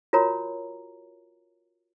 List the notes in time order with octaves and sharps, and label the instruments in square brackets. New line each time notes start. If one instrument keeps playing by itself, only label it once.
[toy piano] F4 F#4 A#4 C#5 A#5